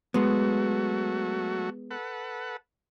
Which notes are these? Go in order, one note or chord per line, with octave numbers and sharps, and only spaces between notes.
F#3 G#3 A3 B3 F#4
A4 B4 F#5